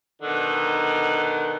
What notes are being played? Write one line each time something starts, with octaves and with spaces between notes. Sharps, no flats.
B2 D3 D#3